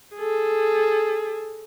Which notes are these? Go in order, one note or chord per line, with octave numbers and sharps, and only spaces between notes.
G#4 A4